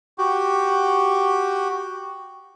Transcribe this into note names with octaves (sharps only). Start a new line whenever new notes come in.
F#4 G4